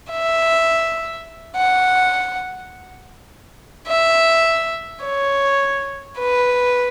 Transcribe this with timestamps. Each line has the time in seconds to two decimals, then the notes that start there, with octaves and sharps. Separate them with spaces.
0.11 E5
1.57 F#5
3.88 E5
5.04 C#5
6.20 B4